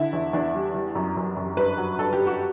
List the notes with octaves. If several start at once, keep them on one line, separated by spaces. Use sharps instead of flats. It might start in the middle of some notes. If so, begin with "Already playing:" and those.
Already playing: D3 E4
E2
E2 D4
G3
G3
F#2
F#2
F#2
G2 B4
F#3
G2 A4
G4
G2
F#4